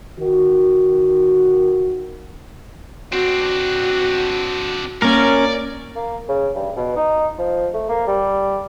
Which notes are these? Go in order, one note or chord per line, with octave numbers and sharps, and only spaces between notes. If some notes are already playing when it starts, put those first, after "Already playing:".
D#3 F#4
C4 D4 F#4
A#3 C#4 A#4 D5
A#3
C#3
G2
B2
D#4
F3
A3
A#3
G3